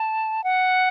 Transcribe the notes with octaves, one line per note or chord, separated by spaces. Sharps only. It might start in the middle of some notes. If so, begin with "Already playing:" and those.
Already playing: A5
F#5